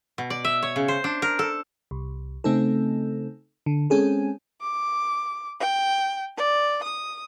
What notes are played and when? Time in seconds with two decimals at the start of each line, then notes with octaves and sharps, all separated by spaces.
0.18 B2
0.30 D5
0.45 E5
0.62 C#5
0.76 C#3
0.88 C5
1.04 D4
1.22 A#4
1.39 A4
1.91 C2
2.44 C#3 A3 C4 D#4 A4
3.66 D3
3.90 G#3 C4 C#4 G#4 A4
4.61 D6
5.60 G5
6.37 D5
6.83 D#6